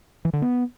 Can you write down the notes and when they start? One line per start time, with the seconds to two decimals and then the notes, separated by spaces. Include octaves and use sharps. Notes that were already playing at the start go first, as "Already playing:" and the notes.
0.25 E3
0.33 D3
0.42 B3